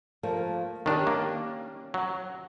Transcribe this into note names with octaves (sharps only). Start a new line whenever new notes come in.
F3 A3 A#3
D#3 C#4 D4 G4
A#3
F#3